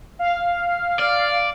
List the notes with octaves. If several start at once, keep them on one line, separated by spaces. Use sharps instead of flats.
F5
D5